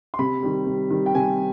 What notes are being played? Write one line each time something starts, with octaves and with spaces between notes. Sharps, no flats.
C6
C3 B5
D#3 G3
C3
D#3 G3
G5
C3 G#5